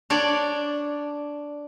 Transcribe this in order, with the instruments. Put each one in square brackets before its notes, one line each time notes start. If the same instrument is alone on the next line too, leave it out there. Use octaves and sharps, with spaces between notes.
[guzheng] D4 C#5 D5